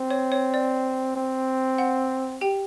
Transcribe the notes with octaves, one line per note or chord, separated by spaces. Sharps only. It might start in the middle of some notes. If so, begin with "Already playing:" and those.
Already playing: C4
C#5
C#5
D5
C4
F#5
G4 G5